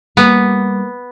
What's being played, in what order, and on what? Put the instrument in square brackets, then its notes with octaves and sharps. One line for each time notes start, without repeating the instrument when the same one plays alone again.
[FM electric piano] G3 [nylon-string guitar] A#3 [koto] B3